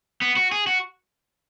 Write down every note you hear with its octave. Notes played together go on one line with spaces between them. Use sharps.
B3
F#4
G#4
F#4